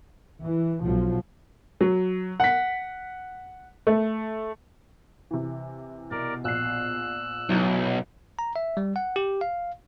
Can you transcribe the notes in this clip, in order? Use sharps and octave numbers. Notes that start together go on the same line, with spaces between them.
E3
B1 F3 F#3
F#3
F#5 B6
A3
C3 E3
B2 A#4 D5
A#1 E6 F#6 C7
B1 F#3 D#4 E4
A#5
E5
G3
F#5
G4
F5